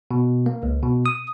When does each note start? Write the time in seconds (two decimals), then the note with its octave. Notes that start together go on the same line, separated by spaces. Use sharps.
0.11 B2
0.46 A#3
0.63 C#2
0.82 B2
1.06 D#6